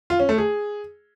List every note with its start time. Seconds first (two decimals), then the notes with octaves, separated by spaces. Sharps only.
0.10 F4
0.19 C#4
0.29 A3
0.38 G#4